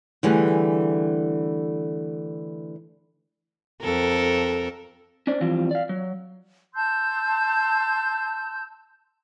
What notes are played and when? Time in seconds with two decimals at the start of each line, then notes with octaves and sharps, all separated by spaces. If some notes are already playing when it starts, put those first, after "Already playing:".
0.23 D3 E3 G3 A3 G#4
3.82 F2 A4 A#4
5.27 C#4 D4 C5 D5
5.41 E3 F3 G3 C4 F4
5.71 D5 F5
5.89 F#3
6.75 A5 C6 E6 G6